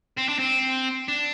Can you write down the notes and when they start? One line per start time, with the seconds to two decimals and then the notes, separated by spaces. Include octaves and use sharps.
0.17 C4
0.28 D4
0.39 C4
1.08 D4